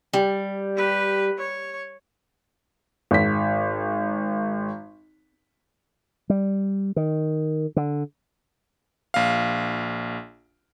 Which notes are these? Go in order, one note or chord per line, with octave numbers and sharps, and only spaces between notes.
G3
G4 B4
C#5
G#1 B6
G3
D#3
D3
A#1 F5